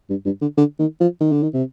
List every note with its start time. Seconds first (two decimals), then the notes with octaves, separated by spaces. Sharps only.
0.10 G2
0.25 G2
0.42 D3
0.57 D3
0.79 D#3
1.01 F3
1.21 D#3
1.32 D3
1.43 D#3
1.53 C3